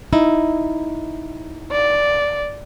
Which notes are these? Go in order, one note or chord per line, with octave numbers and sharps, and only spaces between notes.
D#4 E4
D5